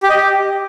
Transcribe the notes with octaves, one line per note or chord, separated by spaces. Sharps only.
G4
D#5
G4